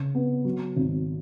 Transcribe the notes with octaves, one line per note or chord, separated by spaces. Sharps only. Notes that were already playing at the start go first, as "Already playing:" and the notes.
Already playing: C#3
B3
F#3
G#1